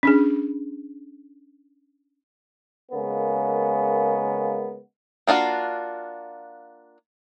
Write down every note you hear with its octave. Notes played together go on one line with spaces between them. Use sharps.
C#4 D4 G#4
C#3 G#3 A#3 B3 A#4
A#3 D4 F4 F#4